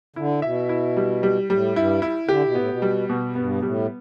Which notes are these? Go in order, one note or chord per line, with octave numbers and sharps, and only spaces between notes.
D3 E4
B2 E5
E4
G3
G3
A2 G3
G2 E4
E4
D3 G4
B2
A2 B3
B2
G3
B2
G2 B3
A2 G3